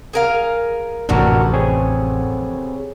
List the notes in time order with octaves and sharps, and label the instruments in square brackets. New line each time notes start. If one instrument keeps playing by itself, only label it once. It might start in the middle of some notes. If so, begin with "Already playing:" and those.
[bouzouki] G#4 A#4 F5
[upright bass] A1 F2 [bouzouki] A2 C3 B3 [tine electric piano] D4 F#4 A#4
[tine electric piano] C4 G#4 C#5